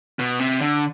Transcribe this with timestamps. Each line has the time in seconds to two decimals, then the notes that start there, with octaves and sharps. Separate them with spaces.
0.19 B2
0.39 C3
0.61 D3